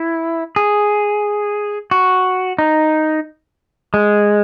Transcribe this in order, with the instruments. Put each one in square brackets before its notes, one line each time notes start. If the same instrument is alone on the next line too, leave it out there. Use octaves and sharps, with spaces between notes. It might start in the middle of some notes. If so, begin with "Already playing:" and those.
Already playing: [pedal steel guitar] E4
G#4
F#4
D#4
G#3